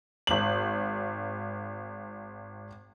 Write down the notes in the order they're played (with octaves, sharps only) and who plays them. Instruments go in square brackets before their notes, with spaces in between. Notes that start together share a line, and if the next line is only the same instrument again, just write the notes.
[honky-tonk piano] G#1 F#7